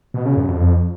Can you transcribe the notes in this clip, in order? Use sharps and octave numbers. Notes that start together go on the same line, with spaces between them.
B2
C#3
F#2
F2